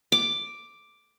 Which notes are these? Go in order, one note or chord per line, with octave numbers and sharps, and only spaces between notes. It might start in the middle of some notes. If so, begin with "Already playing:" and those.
D6